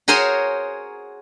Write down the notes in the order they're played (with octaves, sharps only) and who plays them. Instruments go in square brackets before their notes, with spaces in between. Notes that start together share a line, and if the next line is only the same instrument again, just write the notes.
[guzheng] F#4 G#4 A#4 C5 C#5 G#5